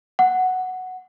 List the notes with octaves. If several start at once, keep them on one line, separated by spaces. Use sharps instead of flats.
F#5